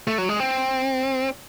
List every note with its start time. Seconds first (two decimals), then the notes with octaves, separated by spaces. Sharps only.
0.08 A3
0.18 F#3
0.29 G#3
0.40 C4